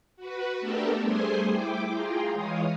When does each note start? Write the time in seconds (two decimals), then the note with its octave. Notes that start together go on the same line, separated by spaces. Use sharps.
0.17 F#4 B4
0.60 A3 B3 D4 G4 A4 A#4
1.02 G3 A3 G#4 C5 G#5 C6
1.48 E4 G5 D6
1.91 F4 G#4 G5 A#5 C6
2.30 E3 G#3 C#5 F5 D#6